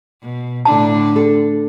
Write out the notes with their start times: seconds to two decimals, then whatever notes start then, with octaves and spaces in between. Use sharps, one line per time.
0.22 B2
0.65 A2 D3 D4 A5
1.16 A4